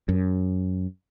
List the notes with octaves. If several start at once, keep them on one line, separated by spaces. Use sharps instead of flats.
F#2